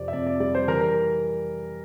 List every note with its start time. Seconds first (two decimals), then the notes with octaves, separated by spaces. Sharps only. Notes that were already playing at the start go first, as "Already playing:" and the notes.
Already playing: F2 C3 D5
0.08 E5
0.13 F2 D5
0.27 D5
0.40 G3 D5
0.55 C5
0.68 E3 A#4
0.81 A#4